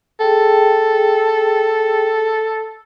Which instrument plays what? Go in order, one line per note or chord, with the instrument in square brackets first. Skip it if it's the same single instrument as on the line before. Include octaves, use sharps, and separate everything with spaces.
[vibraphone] G#4 G5 [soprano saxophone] A4